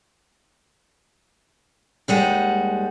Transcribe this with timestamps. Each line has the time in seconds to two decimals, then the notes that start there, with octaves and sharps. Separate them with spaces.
2.08 D#2 G3 G#3 F#5